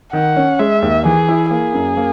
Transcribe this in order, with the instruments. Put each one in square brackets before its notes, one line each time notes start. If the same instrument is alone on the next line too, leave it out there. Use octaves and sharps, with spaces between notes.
[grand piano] D#3 [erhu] F#5
[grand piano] C#4
[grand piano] G#3 [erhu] E5
[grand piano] D#2
[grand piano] E3 [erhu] G#4
[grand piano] E4
[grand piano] A#3 [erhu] G#4
[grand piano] F#2
A#3